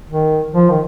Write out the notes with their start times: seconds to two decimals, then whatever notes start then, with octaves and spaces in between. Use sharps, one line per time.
0.09 D#3
0.54 F3
0.70 D#3